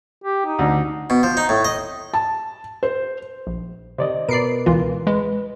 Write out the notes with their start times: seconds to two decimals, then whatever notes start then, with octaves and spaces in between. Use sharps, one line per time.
0.24 G4
0.46 D#4
0.59 D2
1.10 B2
1.23 F3
1.37 D#4
1.49 A2
1.65 D#5
2.14 A5
2.83 C5
3.47 A#1
3.98 C3 D#3 C5 D5 D#5
4.29 B2 A#4 B4 D5 C7 D7
4.66 C#2 E3 F4
5.07 G#3 B4